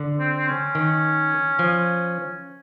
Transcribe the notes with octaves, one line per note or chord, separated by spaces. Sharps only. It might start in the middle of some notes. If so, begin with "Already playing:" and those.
Already playing: D3
C4
C4
C#4
D#3
F3